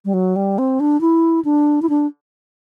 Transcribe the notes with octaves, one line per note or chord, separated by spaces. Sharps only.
G3
F#3
G3
C4
D4
E4
D4
E4
D4